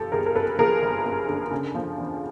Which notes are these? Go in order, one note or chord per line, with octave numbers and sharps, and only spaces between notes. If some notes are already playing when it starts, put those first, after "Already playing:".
Already playing: G1 F3 G4 A4
G1 G#4 A#4
A#4
F#2 A4 B4
F3 G#4 A#4
G1
F#2
D3
C#3
F3
E2